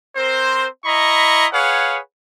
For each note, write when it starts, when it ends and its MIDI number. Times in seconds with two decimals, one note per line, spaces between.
0.16 0.67 60
0.16 0.67 70
0.16 0.67 72
0.85 1.46 64
0.85 1.46 75
0.85 1.46 82
0.85 1.46 83
0.85 1.46 85
1.52 1.99 68
1.52 1.99 71
1.52 1.99 73
1.52 1.99 77
1.52 1.99 78